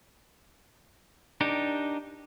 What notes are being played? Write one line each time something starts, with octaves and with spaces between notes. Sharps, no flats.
D4 D#4 G4 A#4